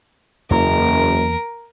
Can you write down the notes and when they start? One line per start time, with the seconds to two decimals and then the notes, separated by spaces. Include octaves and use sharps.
0.50 F#1 E2 A#3 A#4